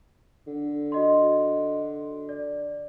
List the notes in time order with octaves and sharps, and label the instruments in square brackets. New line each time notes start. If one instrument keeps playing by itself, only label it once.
[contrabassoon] D3
[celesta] F#4 D#5 C6
D5